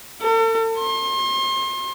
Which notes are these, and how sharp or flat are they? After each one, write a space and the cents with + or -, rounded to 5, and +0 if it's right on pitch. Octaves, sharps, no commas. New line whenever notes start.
A4 +45
C6 +35